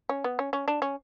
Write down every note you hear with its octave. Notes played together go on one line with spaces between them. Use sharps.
C#4
B3
C#4
C#4
D4
C#4